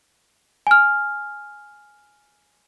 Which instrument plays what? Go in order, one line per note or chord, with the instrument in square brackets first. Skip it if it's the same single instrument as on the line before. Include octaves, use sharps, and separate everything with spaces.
[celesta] G#5 F6